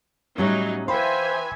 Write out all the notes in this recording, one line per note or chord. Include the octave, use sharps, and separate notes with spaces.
A2 F#3 G3 C#4 D#4
E3 C5 E5 F5 G5 G#5 B5 C6